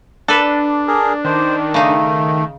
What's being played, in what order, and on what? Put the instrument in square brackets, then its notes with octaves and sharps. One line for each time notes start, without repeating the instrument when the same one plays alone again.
[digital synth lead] D4 [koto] A4 B4
[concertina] G#4 A#4
[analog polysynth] D#3 [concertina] C5
[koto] C#3 D#4 [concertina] A3